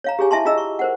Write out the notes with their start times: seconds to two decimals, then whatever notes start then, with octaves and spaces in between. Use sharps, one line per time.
0.04 C#5 F5 A#5
0.19 G4 G#4 C#5 G#5
0.31 E4 E5 G#5 A5 C6
0.45 F4 G#4 D#5 A#5 E6
0.58 C#6
0.79 A#4 C5 F#5